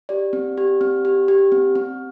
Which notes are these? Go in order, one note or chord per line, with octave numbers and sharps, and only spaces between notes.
G4 D5
C4
G4
C4
G4
G4
C4
C4